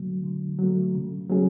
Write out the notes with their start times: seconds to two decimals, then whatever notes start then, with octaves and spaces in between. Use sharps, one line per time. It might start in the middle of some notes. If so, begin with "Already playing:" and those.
Already playing: D3 F#3 A3
0.23 D3
0.59 F#3 A3
0.95 C#3
1.29 F#3 A3 C#4 G#4